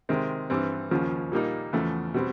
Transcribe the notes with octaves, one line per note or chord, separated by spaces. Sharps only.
C3 D#3 G#3 C4
G2 E3 G3 C4
D#2 C#3 F3
A#2 G3 A#3 D#4
E2 C#3 F3 A3
B2 G3 C4